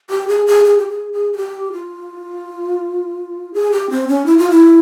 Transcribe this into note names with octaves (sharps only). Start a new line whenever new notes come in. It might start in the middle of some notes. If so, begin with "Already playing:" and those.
G4
G#4
G#4
G#4
G4
G#4
G#4
G#4
G4
F4
G#4
G4
C4
C#4
E4
F4
E4